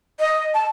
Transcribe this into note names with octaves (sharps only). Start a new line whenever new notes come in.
D#5
A5